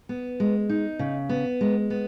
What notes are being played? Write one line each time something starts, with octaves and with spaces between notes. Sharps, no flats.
B3
G#3
D#4
C#3
B3
G#3
B3